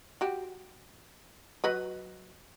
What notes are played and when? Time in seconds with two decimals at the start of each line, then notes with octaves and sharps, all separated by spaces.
0.21 F#4 G4
1.64 F#3 B4 D#5